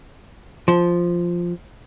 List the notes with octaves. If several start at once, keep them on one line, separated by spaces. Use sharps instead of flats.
F3